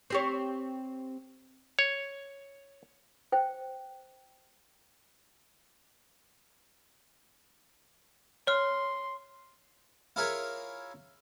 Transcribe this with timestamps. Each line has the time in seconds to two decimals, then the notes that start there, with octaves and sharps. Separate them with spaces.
0.10 C4 G4 C#5
1.79 C#5
3.32 C5 G5
8.47 C#5 C6 F6
10.16 E4 F4 G#4 A#4 C#5 B5